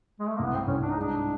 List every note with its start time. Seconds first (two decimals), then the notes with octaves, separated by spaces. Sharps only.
0.20 G#3
0.28 A3
0.36 C2 A#3
0.44 B3
0.53 C4
0.67 C2 C#4
0.82 D4
0.91 D#4
0.96 G#2 D4